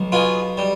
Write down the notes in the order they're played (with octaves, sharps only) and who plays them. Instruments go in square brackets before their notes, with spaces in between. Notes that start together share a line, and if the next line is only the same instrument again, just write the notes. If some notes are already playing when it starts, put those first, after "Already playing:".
Already playing: [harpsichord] B1
B2 F4 G#4
G3